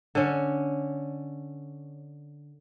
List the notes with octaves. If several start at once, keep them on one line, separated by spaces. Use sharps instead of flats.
D3 C#4